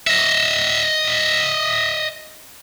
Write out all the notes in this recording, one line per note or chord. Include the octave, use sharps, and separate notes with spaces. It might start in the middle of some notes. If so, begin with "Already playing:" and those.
D#5 E5